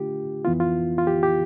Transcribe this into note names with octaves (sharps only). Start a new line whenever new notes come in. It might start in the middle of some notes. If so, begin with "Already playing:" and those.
Already playing: D3 A3 D4 F4 G4
F2 E3 B3 E4 F4
F4
F4
G4
G4